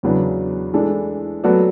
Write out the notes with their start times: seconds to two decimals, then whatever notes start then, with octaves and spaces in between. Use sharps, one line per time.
0.03 E2 C#3 F#3 B3 D4
0.73 E3 G#3 D4 A4
1.44 F#3 B3 F#4 A4 D5